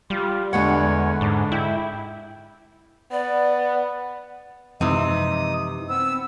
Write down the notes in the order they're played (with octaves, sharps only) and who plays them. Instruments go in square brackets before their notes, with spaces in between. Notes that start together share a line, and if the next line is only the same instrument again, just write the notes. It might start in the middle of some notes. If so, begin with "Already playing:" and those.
[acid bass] G3 [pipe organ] F4
[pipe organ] E2 B3 C#5 [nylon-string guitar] D3 G#3 F#5
[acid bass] G#2 [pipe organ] D4
[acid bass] E4 [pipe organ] G5
[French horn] B3 [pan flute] D5
[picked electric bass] F#2 F3 G#3 [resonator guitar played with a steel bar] C3 E3 [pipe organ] D#4 D#6
[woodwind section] B3 E6 [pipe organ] C4